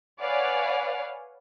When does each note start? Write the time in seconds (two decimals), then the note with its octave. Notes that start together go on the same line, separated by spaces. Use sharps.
0.21 B4 C#5 D5 F5 F#5 G#5